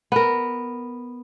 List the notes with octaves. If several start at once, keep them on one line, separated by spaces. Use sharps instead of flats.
B3 A#4